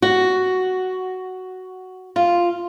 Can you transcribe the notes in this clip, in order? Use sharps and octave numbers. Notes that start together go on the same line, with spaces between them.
F#4
F4